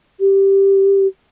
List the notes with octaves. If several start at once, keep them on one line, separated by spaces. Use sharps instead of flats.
G4